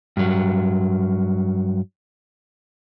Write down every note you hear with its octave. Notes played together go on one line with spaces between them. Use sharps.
G2 F#3